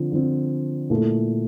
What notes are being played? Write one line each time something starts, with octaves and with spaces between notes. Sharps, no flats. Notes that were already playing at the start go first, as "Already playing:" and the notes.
Already playing: D3 F3 C4
D3 F3 C4
A#2 A3 E4 A4